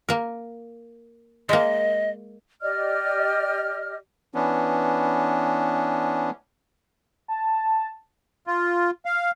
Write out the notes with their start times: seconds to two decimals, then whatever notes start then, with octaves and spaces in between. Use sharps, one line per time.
0.09 A#3 A#4
1.49 G#3 A#3 D#5
2.61 G4 D5 D#5 F6
4.34 E3 B3 C#4 D4
7.28 A5
8.47 F4
9.05 F5